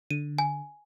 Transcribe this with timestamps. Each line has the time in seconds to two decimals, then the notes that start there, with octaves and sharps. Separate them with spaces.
0.11 D3 D#7
0.38 G#5